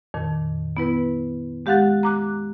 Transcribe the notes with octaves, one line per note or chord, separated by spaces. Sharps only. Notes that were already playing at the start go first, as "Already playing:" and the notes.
F2 A#2 D#3
B3 E4 B4
G#3 G4 F5 F#5 F#6 A6
A#5 D6 F#6